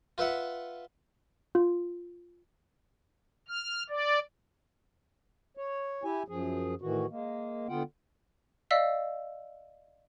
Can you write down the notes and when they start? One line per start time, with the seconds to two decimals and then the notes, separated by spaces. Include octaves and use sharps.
0.18 F4 B4 E5 F#5
1.55 F4
3.48 F6
3.90 D5
5.57 C#5
6.04 E4 G4 G#5
6.28 F#2 F3 G#4
6.81 A2 D#3 E3 F#4
7.10 G#3 A#3
7.69 D3 B3 F4 F#5 G5
8.71 D5 D#5 F5 E6 B6